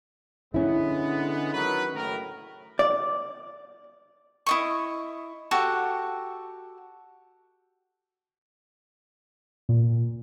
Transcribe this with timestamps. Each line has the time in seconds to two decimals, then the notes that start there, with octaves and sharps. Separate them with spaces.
0.54 D3 G#3 B3 C#4 E4
1.53 D#3 F#3 B4
1.95 F#1 A2 A#4
2.79 D5
4.46 E4 D#5 C#6
5.51 F#4 G4 A4 F#5
9.69 A#2